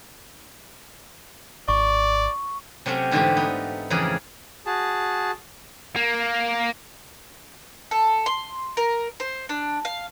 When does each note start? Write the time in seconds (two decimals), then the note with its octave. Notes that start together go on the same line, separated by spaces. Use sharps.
1.68 G#1 D5 C#6
2.86 C3 F#3 A3 C4 C#4
3.11 G#2 D3 E3 A3 F4 G4
3.37 B3 D#4
3.90 F2 C#3 E3 G#4 A#4 D5
4.66 F#4 G#4 A5
5.96 A#3
7.91 A4
8.26 C6
8.77 A#4
9.20 C5
9.49 D4
9.85 F5